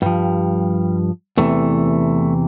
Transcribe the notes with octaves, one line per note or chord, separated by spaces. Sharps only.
G2 F3 G3
E2 C3 E3 A3